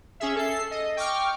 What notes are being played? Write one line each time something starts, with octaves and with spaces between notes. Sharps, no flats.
C#4 G#4 E5
A4 C7
D#5
G5 C#6 D6 F6